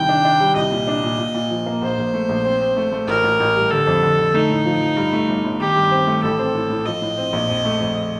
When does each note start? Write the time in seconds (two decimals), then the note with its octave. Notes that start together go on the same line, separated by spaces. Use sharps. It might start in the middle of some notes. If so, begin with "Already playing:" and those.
Already playing: C2 D#3 G5
0.09 D4
0.25 D4
0.40 G3
0.56 C2 D#5
0.72 A#2
0.87 D4
1.04 A#2
1.19 A#2
1.34 A#2
1.51 F3
1.66 A#3
1.82 A#1 C5
1.98 A#1
2.14 A3
2.29 A#1
2.45 C4
2.61 C4
2.77 A3
2.92 A3
3.08 A1 A#4
3.23 A1
3.40 A1
3.55 G3
3.70 D3 A4
3.87 F2
4.03 D3
4.18 D3
4.34 A3 D#4
4.50 A2
4.65 F3
4.81 F3
4.97 G2
5.13 A3
5.28 G1
5.44 G1
5.60 D#3 G4
5.76 G2
5.91 C4
6.07 A3
6.23 A1 A4
6.39 C4
6.54 A2
6.70 A2
6.86 F3 D#5
7.02 A2
7.17 C4
7.33 A#1
7.49 F2
7.65 A3
7.80 F2